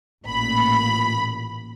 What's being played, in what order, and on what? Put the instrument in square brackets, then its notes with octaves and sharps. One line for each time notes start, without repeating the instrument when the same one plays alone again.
[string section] A1 A#2 B5